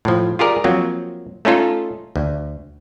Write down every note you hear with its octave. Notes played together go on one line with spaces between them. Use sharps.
A2 F3
F4 G4 G#4 A#4 D5
F3 F#3 A#3 C4
A3 C#4 D#4 F4 A4
D2